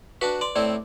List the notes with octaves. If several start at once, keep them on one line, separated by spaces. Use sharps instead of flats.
D4 F#4 B4
D5 C6
A2 C4 E4 D5